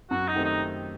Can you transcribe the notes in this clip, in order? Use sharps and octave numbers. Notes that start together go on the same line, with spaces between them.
F#2 F#4
D#4
D#3 A3 C4 G4
D#4